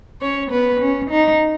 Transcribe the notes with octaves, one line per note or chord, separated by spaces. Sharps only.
C#4 C#5
B3 B4
C#4
D#4